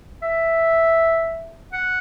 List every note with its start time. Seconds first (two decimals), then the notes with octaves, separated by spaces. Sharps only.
0.22 E5
1.73 F#5